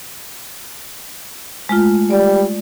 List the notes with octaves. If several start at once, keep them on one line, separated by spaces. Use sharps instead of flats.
G#3 A3 F4
G3 D5